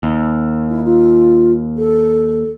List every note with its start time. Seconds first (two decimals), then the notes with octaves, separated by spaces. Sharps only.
0.03 D#2
0.69 E4
0.84 F4
1.78 A4